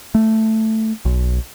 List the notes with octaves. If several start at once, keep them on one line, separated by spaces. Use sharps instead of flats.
A3
B1